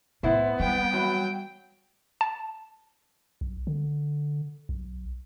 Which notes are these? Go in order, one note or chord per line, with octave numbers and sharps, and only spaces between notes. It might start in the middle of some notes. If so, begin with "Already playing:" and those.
A2 B3 E4 C5
G3 G5
E2 F#3
A5
B1
D3
B1